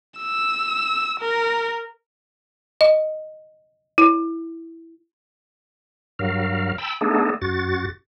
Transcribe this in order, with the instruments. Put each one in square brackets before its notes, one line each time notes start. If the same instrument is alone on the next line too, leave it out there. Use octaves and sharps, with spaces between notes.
[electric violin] E6
A#4
[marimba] D#5
E4
[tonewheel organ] G2 F#3 A#4 F5
G5 A5 B5 E6
A3 B3 D4 D#4 G#4 A4
F#2 F#4 A6